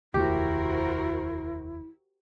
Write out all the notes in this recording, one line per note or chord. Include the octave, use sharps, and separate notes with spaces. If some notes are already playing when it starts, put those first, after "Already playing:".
F1 D#2 A3 E4 F#4 G4 A#4 C5